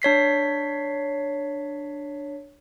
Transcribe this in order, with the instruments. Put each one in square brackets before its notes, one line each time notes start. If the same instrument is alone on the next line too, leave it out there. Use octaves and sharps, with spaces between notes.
[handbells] D4 C#5 B6 C7